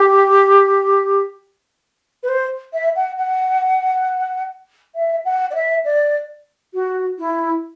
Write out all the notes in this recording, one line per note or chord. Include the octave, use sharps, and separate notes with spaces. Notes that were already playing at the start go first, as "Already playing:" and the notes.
Already playing: G4
B4
C5
E5
F#5
F#5
E5
F#5
D5
E5
D5
F#4
E4